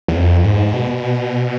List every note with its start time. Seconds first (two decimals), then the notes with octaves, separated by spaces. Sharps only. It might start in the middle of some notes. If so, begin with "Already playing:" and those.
0.08 E2
0.16 F2
0.45 G#2
0.73 B2